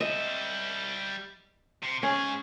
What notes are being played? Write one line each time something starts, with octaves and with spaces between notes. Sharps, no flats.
G3 D#5 E5
C3
G#2 C#4 G#4